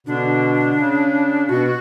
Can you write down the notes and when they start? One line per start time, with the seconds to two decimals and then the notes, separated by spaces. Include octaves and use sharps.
0.07 B2 D3 D4
0.79 C#3
1.49 B2 F#4